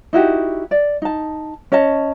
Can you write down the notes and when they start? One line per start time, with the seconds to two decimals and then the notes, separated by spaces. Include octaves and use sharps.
0.13 D#4 E4 F#4 G4
0.71 D5
1.02 D#4 A5
1.72 C#4 C#5 D#5 A5